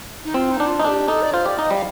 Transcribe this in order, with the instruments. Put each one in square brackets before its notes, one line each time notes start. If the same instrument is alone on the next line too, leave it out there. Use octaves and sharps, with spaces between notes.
[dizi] D#4
[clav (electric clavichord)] C4 [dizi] F4
[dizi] D#4
[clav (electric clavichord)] D4
[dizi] F4
[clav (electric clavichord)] D#4
[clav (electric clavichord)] D4 [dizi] A4
[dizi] G4
[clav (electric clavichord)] D#4 [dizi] A4
[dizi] D5
[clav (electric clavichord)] F4 [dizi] C5
[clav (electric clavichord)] G4 [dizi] D5
[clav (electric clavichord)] D#4 [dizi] D#5
[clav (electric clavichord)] G3 [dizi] F5